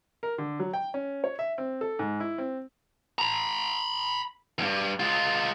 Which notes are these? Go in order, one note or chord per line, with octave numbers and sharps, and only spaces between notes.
A#4
D3
F#3
G5
C#4
C#5
E5
C4
A4
G#2
E4
C4
A#5 B5
E2 G2
G#3 F4